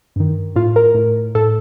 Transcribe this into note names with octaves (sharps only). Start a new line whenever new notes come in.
G2 D#3
A2 F4
A#4
A2
A2 A4